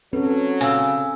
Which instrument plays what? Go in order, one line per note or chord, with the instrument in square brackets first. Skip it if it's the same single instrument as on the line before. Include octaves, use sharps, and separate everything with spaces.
[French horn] F#3 [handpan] C4 C#4 A4 [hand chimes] B4
[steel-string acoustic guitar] C#3 [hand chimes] G#5 E6